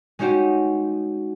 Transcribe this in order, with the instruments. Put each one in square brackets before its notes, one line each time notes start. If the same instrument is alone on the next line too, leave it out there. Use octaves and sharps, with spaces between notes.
[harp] G#3 C#4 D#4 F#4 G4